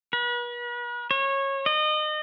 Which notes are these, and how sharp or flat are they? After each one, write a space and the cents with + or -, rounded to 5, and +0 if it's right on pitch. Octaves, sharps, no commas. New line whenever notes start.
B4 -40
C#5 -20
D#5 -30